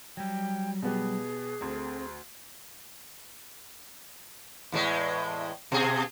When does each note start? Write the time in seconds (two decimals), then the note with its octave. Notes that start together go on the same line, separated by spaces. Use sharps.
0.17 F#3 G3 G5
0.82 B2 B3 G4 G#4
1.61 D2 A3 C4
4.72 E2 A2 G#3
5.72 B2 G#4